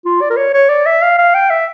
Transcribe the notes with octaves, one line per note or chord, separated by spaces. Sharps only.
F4
D5
A#4
C#5
C#5
D5
E5
F5
F5
G5
E5